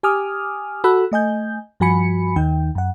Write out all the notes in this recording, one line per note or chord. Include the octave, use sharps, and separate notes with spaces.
G4 G#5 D6 D#6 F6
F#4 A4 B5 E6 F#6
A3 D#5 G#5 G6
G2 F3 F#4 G#5 B5 C#7
D#2 D#3 D#4 G5
F#2 F#5